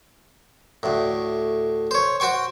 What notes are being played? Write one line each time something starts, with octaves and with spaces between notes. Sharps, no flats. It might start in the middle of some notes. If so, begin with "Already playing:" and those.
D2 A2
C5 C#5
F#4 C5 G5 C#6